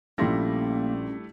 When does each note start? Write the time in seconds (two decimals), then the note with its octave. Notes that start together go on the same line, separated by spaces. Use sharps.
0.18 A#1 G3 A3 A#3 C#4 E4 C6 A#6